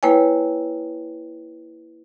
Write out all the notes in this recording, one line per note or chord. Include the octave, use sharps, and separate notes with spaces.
A#3 E4 B4 C#5 G5 G#5